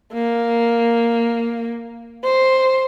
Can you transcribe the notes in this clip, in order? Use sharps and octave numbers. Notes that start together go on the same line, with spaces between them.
A#3
C5